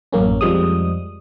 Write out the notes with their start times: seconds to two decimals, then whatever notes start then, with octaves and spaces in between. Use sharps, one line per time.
0.13 A1 F#2 A#3 C#4
0.41 F2 F3 G3 G#3 D#6